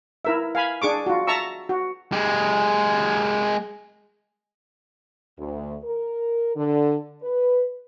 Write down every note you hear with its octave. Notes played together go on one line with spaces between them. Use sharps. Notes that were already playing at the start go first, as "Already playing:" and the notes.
E4 A#4 E5
F5 G#5 B5
D4 G#4 C#6 D6
F4 F#4
E5 A5 A#5 C#6 E6
F#4
G#3 G4
D2
A#4
D3
B4